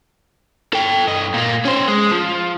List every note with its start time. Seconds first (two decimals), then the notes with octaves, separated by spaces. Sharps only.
0.73 A4 G5
1.07 G2 D#5
1.34 A#2 A#3
1.65 C#4 C5
1.88 G#3
2.11 F3